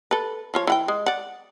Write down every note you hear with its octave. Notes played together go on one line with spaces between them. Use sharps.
A4 B4
F3 F4 C#5
E3 F#5 G5
G#3
D5 F#5